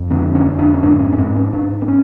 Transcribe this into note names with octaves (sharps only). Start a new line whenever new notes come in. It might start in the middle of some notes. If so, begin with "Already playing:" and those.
Already playing: F2
D3 C4
C#4
F2
D4
C#4
G#2 D4
C#4
C#4
G#2 C4
C#4
G#2 D4
C4
C#4